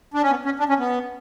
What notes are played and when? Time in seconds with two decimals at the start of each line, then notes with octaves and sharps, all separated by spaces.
0.14 D4
0.23 C#4
0.30 B3
0.45 C#4
0.59 D4
0.69 C#4
0.79 B3